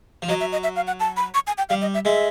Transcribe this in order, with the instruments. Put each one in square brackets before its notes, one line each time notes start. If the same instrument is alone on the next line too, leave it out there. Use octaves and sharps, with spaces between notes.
[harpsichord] F3
[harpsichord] F#3 [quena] D#5
[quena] E5
D#5
E5
F5
F#5
A5
B5
C#6
G#5
G5
[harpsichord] G3 [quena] F5
[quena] D#5
E5
[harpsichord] G#3 [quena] E5